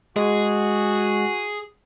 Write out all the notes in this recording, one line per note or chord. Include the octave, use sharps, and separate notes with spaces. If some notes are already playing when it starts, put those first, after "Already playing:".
G#3 F#4 G#4